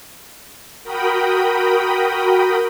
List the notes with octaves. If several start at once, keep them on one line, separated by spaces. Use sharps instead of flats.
F#4 A#4 G5 B5 D#6